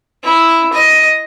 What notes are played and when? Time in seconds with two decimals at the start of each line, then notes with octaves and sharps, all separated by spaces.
0.23 E4
0.72 D#5